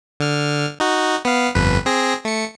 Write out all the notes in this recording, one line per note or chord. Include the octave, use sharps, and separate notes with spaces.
D3 F6
D#4 F#4
B3 F5
G1 F2 B4
C4 G#4 A#6
A3 C#7